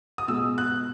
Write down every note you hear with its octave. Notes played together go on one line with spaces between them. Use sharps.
D#6
B2 G#3 E6
F#6